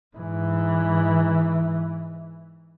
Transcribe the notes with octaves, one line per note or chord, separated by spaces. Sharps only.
G#2 E3